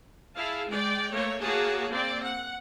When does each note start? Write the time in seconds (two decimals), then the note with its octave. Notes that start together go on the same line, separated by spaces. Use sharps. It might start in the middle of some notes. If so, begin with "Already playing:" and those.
0.37 E4 G#4 F5 A5
0.69 G#3 D5 G5
1.11 A3 A#3 C#5
1.40 A#3 F#4 G#4 C#5 A5
1.92 A#3 C4 D5
2.24 F#5